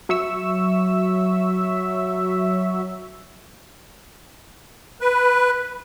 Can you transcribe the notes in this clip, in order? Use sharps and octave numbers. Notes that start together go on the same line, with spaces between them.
F#3 E5 C#6 E6
B4